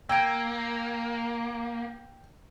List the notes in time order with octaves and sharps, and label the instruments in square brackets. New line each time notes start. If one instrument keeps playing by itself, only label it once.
[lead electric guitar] A#3 [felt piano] G5 [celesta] E6 G#6 D7